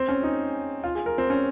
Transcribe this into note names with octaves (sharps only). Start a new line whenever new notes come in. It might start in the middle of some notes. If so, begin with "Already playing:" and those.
Already playing: C4
C#4
D#4
F4
G#4
A#4
C4
C#4